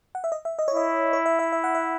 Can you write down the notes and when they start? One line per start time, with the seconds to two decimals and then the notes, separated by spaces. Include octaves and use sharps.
0.15 F#5
0.24 E5
0.32 D#5
0.45 E5
0.59 D#5
0.68 C#5
0.73 E4 D#5
1.13 C#5
1.26 E5
1.39 E5
1.52 E5
1.64 F#5
1.75 E5